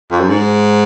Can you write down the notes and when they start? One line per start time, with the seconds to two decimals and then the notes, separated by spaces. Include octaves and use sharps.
0.12 F2
0.20 F#2
0.29 G#2